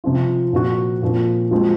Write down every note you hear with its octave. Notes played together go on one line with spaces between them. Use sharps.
C3 F3 C4 F4
A#2 F3 C4 F#4
A#2 F3 C4
F3 G#3 C4 F#4